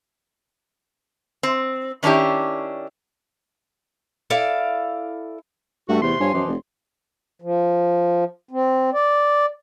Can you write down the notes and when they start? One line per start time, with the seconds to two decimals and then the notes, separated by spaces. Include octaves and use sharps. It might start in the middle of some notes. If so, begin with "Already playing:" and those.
1.43 C4
2.03 D#3 C#4 D4 E4 G4
4.30 E4 A4 D5 F5
5.88 G2 A3 F#4
6.02 E2 C3 A3 C6
6.20 G2 F3 C#5 G#5
6.33 F#2 B2 E3 F3
6.48 F1
7.42 F3
8.51 C4
8.94 D5